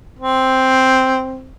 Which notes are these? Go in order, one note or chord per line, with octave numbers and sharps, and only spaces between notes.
C4